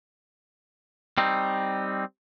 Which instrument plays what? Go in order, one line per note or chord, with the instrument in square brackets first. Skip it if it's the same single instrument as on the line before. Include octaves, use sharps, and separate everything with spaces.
[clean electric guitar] G3 C4 D#4